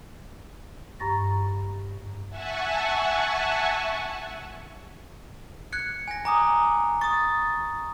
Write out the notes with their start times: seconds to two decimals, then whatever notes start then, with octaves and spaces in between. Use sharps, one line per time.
1.00 G2 A#5 C#6 A6 A#6
2.29 E5 F#5 G#5 A5 C#6
5.72 F#6 G#6 C#7
6.08 G#5 A#6
6.25 G#5 A#5 D6 D#6
7.01 C#6 D#6 A6